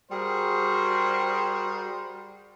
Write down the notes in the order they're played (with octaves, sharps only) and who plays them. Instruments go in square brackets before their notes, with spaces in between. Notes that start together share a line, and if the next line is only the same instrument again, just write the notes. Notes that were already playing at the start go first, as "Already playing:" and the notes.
[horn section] G3 F#4 G#4 A#4 C5